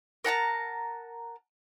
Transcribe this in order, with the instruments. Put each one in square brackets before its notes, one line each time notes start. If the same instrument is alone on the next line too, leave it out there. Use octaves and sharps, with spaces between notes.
[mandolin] A#4 F#5 A5 A#5